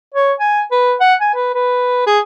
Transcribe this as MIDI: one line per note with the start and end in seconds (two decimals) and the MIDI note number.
0.14 0.32 73
0.40 0.62 80
0.71 0.95 71
1.00 1.14 78
1.20 1.31 80
1.34 1.51 71
1.54 2.03 71
2.06 2.19 68